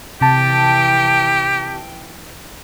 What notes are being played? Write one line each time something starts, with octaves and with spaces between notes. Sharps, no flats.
C3 E3 G4 G5 A5